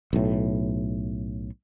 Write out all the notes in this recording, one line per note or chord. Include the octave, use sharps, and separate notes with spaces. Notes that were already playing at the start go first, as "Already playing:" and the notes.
B1 A2